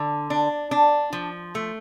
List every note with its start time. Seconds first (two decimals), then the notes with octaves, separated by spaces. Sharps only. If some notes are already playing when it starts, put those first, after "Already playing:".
Already playing: D3
0.30 D4
0.71 D4
1.13 F3
1.55 A3